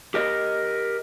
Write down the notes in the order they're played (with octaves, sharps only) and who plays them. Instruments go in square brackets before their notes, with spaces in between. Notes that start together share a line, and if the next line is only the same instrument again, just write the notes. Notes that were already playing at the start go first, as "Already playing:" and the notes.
[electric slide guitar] G4 A#4 D#5